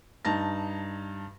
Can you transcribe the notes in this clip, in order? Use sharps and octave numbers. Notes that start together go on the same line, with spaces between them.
G2 D#4 A5 A#6